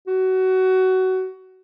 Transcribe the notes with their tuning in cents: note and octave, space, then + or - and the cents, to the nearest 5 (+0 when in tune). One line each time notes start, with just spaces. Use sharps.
F#4 +20